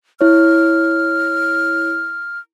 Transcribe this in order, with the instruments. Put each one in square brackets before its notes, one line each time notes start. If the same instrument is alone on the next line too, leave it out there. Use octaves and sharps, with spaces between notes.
[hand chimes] E4 C#5 [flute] F6